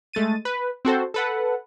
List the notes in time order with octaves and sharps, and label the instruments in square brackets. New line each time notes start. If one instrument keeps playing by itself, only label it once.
[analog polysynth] G#3 A3 A6 D#7
B4
C4 F#4 A4 C5
A4 B4 F#5